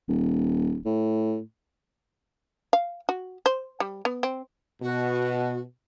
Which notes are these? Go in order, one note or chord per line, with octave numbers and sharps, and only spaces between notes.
D#1
A2
F5
F#4
C5
G3
B3
C4
B2 F#4